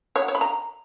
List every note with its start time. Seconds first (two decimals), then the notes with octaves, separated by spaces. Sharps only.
0.16 C#5
0.22 F#5
0.28 C#5
0.35 B5
0.41 A#5